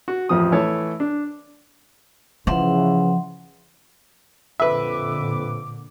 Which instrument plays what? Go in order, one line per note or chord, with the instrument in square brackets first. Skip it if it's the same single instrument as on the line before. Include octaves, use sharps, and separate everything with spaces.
[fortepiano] F#4
A1 F2 F3 D#6
E3 A3 C#5 A5
D4
[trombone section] C#3 E3 [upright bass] F3 [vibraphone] E5 F#5 C6
[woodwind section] F2 D6 [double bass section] A#2 D3 [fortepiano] B4 E5